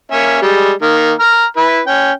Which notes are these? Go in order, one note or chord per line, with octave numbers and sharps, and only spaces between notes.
A#3 C#4 E5
G3 G#3
D#3 A#3
A#5 F6
E4 B4
C#4 G5